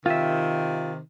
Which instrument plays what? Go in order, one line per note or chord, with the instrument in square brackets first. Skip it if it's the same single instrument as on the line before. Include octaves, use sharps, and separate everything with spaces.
[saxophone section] C3 D#3 [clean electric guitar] F4 E5